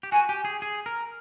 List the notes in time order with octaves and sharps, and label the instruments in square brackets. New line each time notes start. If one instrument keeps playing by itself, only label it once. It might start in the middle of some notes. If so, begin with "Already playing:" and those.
[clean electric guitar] G4
[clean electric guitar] F#4 [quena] G#5
[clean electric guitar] G4
G#4
G#4
A#4